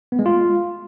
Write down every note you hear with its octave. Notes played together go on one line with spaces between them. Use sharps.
B3
G#3
F4